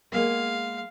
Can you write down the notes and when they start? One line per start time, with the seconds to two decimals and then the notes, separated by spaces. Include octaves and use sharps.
0.12 G#3 A#3 B3 F5